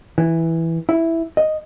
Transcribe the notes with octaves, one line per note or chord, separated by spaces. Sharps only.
E3
E4
D#5